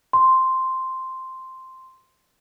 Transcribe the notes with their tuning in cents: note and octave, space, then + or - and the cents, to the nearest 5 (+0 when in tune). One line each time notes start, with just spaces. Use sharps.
C6 +0